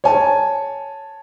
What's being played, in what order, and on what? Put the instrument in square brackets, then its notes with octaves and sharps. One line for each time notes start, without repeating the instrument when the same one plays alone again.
[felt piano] C#5 G#5 A5